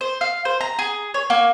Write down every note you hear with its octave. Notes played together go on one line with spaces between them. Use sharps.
C5
F5
C5
A#5
G#4
C#5
A#3